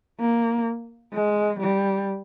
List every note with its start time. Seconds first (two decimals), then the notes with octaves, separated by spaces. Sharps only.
0.20 A#3
1.14 G#3
1.60 G3